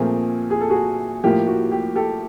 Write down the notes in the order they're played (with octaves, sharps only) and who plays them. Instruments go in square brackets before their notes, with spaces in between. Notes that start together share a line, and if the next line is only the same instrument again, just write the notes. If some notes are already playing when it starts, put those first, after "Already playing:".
Already playing: [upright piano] A#2 F3 A3 C4 G#4 A#4
G#4
A4
F#4 G#4
A2 F3 A#3 G4
F#4
G4
G4 A4